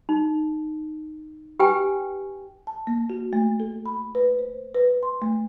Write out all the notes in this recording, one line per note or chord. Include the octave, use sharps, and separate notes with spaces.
D#4
G4 B4 G5 G#5
A5
A#3
F#4
A3
A4
B5
B4
C5
B4
C6
A3